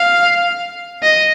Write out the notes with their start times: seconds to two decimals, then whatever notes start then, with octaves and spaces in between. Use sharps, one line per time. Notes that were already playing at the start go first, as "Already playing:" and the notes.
Already playing: F5
1.02 D#5